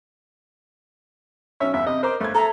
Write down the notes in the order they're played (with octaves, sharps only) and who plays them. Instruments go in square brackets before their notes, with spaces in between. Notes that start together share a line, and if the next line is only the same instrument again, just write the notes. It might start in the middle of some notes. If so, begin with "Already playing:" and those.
[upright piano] B1 C#4 C#5 [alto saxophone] E5
[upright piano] G1 E2 [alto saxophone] E5
[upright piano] C3 [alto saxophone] D#5
[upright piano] A#4 A#5 D6 [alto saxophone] C5
[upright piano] G1 G#6 [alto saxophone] A3
[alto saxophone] A4 [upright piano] E5 A5 [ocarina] A#5